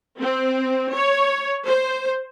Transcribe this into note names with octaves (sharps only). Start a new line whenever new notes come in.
C4
C#5
C5